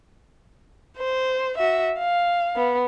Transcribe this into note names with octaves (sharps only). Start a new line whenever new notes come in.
C5
F#4 E5
F5
B3